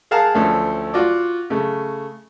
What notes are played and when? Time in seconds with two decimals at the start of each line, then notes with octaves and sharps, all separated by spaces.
0.11 G#4 A#4 F5 F#5 A5 A#5
0.34 D2 F3 A3 C#4 A4
0.94 F4 F#4 D5
1.50 C#3 A3